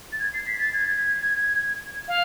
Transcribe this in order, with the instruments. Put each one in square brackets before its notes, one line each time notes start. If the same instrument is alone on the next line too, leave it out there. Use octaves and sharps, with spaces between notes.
[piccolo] A6
G#6
C7
B6
A6
G#6
F5